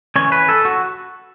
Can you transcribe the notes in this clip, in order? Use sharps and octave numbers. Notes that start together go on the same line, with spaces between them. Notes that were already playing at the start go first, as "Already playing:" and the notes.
E3 C#4 C#5
B4
A4
F#4